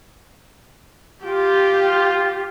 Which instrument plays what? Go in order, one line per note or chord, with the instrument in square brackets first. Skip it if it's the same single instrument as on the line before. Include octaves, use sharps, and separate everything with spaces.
[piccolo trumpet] F4 [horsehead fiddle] G4